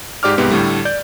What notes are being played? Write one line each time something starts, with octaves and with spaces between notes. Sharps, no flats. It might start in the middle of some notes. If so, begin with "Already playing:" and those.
G#2 G4 D5 D6 F6
C2 G#2 B3 G4
A2 D3 G3 A3
D5 G6